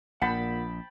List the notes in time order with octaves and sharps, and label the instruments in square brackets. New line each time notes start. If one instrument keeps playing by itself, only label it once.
[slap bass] A#1 [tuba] A#2 [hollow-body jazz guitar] F#5 [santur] G5 A5 B5